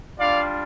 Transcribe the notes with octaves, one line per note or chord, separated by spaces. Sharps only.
G3 D4 F4 D5 F5